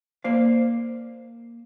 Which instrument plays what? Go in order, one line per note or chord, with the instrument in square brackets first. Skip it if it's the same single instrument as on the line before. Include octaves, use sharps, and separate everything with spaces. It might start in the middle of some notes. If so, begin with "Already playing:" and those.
[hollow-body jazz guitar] A#3 C5 D5 F5